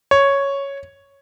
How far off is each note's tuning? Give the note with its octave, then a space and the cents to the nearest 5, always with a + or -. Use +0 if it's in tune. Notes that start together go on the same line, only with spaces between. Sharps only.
C#5 +0